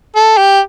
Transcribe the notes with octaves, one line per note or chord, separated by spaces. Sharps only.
A4
G4